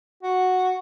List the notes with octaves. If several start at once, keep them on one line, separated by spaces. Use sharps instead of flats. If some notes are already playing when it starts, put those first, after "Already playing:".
F#4